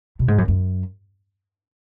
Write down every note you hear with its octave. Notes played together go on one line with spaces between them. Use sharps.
B2
G#2
F#2
F#2